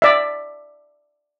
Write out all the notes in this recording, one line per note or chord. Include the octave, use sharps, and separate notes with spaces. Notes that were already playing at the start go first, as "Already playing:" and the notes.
D5 E5